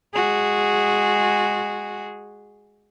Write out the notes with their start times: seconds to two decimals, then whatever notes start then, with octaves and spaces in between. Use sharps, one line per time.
0.13 G#3 F#4 G#4